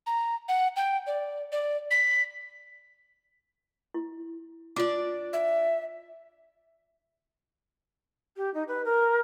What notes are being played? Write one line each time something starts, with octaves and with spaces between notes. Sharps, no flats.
A#5
F#5
G5
D5
D5
B6
E4
D4 F4 D5 D6
E5
G4
D#4
B4
A#4